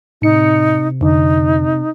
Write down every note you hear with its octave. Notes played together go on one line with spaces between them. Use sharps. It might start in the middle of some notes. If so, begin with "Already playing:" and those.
A2 C3 D#4 C#7
F2 D3 D#4